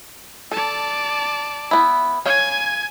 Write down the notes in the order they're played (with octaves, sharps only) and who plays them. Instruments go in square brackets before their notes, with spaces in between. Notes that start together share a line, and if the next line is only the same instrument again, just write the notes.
[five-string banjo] A4 [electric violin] D5 A5
[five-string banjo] B3 E4
[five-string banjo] C#5 F5 [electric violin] G#5 G#6